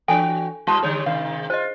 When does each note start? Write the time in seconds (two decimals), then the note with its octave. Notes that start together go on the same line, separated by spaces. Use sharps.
0.08 E3 D4 F#4 A4 G5 G#5
0.67 G3 E4 F#4 A5
0.83 D3 G3 G#4 C#5
1.06 G#2 C3 D#3 F5
1.50 F4 C5 D#5